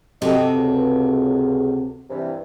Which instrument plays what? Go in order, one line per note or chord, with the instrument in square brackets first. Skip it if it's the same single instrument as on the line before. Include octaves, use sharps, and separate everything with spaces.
[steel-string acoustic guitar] C3 F#4 A4 [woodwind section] G4 D#5
[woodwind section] C#2
G2 C3 E3